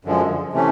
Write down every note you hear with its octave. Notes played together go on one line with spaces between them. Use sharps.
F#2 D3 F3 G#3
C3 E3 A3 C#4